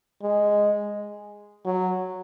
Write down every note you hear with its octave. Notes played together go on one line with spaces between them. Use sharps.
G#3
F#3